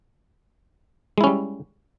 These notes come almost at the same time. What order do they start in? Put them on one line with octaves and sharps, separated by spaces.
G#3 E4 C#4 G3